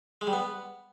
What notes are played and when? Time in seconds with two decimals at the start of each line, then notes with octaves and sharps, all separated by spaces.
0.21 G#3
0.27 G3
0.33 B3